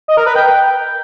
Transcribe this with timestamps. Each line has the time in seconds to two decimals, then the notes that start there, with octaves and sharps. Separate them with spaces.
0.08 D#5
0.17 A#4
0.26 B4
0.35 G5